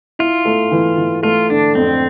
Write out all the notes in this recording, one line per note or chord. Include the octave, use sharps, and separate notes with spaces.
E4 F4
A3
E3
E3
A3 F4
D3 D4
F2 C4